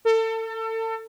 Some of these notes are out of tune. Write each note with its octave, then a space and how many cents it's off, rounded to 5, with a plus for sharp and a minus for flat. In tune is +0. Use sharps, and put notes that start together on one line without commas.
A4 +30